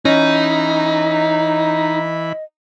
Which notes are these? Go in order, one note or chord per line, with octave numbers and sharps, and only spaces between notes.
E3 C#4 D#4 D#5 B5